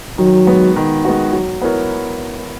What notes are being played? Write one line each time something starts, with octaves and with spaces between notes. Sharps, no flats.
D#3 F#3
G#3 B3 F#4
D#3
G#3 B3 F#4
F#3
B3 E4 A#4 C#5